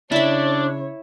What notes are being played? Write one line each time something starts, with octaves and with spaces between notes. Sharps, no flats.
C#3 D4 E4 C#5 E5